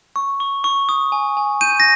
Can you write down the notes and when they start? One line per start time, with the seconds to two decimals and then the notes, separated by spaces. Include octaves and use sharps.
0.16 C#6
0.40 C#6
0.64 C#6
0.89 D#6
1.12 G#5
1.37 G#5
1.61 G6 D#7
1.80 A#6